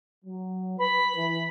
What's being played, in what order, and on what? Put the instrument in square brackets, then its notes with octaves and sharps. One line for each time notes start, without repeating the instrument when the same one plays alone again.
[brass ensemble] F#3
[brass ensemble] B4 [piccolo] B5
[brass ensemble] E3